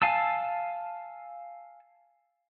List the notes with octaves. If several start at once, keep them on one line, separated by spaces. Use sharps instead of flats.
F5 G#5 A5 E6